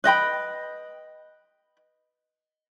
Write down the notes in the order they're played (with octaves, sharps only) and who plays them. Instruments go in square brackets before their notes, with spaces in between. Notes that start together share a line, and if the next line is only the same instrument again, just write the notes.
[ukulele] B4 D#5 G5 B5